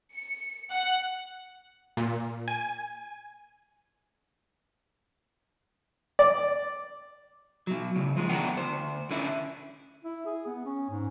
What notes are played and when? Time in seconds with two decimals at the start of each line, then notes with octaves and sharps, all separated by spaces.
0.13 C#7
0.71 F#5
1.97 A#2
2.48 G#5
6.19 D5
7.67 B2 F#3
7.96 A2 C#3
8.16 D#2 F3 G#3
8.29 B1 B3 D4 A#4 F#5 G5
8.56 D2 C5
9.11 D3 C#4 E4
10.05 E4
10.26 G#4
10.46 B3
10.65 C#4
10.90 G#2